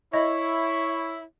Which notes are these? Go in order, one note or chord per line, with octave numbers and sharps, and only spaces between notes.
E4 C#5 D#5